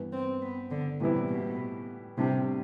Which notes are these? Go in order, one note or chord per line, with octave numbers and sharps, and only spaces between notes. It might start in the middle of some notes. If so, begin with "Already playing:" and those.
Already playing: G2 E3 B3
C4
B3
D3
A2 C3 E3 G3 B3 E4
B2
A2 C3 G3 D4 G4